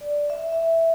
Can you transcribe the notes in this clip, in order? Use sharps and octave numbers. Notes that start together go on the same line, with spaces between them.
D5
E5
E5